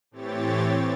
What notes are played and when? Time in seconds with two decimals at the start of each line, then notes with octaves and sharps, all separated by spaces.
0.11 A2 E3 C4 G4 C#5 A6